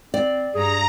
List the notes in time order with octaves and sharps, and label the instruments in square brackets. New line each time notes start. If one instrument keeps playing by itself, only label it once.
[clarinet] C4 [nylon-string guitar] D5
[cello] G2 [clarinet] G#4 [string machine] A#5